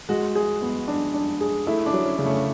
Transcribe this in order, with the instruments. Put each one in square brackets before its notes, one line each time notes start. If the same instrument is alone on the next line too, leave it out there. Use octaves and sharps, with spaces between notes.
[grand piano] G#3 [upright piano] F#4
[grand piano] G#4
B3
D4
D4
G#4
[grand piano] A3 [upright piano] E4
[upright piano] D4
[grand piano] F#3
[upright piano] C#4
[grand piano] C#3
[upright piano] A3